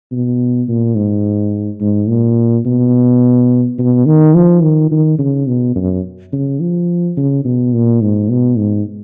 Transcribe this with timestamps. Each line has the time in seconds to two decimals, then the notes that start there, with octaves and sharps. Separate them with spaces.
0.11 B2
0.68 A#2
0.95 G#2
1.80 G#2
2.08 A#2
2.66 B2
3.78 B2
4.06 D#3
4.35 F3
4.63 D#3
4.92 D#3
5.19 C#3
5.47 B2
5.76 F#2
6.32 C#3
6.60 F3
7.17 C#3
7.45 B2
7.73 A#2
8.01 G#2
8.29 B2
8.57 G#2